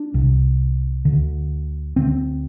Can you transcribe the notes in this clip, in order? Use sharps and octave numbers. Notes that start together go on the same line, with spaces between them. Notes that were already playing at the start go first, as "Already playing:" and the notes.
Already playing: D4
C2 C3
D2 D3
D2 D3 C4